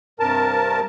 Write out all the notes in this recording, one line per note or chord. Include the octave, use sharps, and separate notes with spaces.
G2 C3 A#4 A5